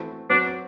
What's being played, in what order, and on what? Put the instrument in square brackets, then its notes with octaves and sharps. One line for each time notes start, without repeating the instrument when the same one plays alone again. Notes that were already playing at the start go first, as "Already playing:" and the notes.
Already playing: [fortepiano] E3 A3 C4 F#4
[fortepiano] F#3 C4 F#4 B4 [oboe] D4